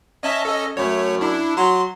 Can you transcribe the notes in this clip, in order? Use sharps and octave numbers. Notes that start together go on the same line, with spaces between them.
C#4 D#5 E5 A5
A4 D#5
F#2 A3 C#5
D4 E4
F#3 C6